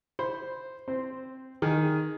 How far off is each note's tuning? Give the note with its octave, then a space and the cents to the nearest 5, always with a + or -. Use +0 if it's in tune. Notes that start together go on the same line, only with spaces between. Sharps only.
C5 +0 B5 +0
C4 +0 C5 -10
D#3 +0 G#4 +0